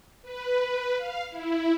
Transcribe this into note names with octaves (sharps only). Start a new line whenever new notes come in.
B4
F5
E4